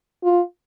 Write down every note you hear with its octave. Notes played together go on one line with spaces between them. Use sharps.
F4